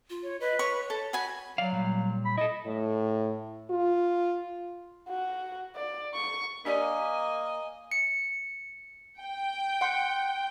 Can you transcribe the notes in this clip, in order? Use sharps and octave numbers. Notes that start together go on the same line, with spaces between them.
F4
C#5
B4 D#5
C#5 C#6
A4 A5
F#4 G#5 B5
F#3 D5 F5
A#2 G3
B5
E4 A4 D#5
A2
F4
F#4
D5
C#6
A#3 D4 G4 D5 D#5 G#5
C#7
G5
F#5 C6